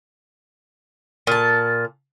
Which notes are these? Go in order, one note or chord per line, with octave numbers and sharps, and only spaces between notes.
A#2 A5